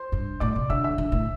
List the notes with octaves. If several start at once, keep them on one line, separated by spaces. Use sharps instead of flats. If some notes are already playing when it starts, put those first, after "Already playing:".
Already playing: C5 C6
G2
A2 D5 D6
C3
D3 E5 E6
E5 E6
D3
A2